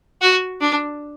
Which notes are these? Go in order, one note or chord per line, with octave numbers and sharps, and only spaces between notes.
F#4
D4